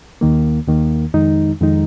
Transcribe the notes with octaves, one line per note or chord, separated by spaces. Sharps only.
D#2 D#3 A#3
D#2 D#3 A#3
F2 D#3 G#3 D#4
F2 D#3 G#3 D#4